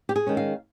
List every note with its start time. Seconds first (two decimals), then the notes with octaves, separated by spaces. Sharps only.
0.09 G4
0.16 G#4
0.27 D#3 G#3 C#4
0.37 F5